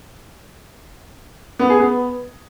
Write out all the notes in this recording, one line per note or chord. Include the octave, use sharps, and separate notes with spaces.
B3
G#4
B3